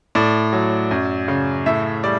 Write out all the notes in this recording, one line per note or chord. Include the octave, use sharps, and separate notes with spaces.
A2 D5
F#3
F#2
C#3
A2 E5
G3 D5